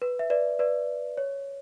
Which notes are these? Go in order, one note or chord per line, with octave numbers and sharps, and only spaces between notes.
B4
E5
B4 D5
B4 D5
C#5